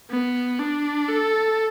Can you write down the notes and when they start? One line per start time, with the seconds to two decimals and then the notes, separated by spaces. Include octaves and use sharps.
0.11 B3
0.59 D4
1.08 A4